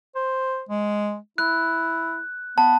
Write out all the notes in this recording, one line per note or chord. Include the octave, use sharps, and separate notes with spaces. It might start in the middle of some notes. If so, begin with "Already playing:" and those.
C5
G#3
E4 F#6
B3 A5